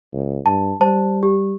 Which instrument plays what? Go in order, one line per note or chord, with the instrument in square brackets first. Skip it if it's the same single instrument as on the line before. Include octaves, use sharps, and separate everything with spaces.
[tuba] C#2
[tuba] G2 [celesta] A5
[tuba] G3 [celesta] C5 A5
[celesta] G4